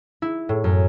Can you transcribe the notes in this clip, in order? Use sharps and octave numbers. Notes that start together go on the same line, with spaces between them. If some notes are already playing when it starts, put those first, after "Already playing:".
E4
A2
F#2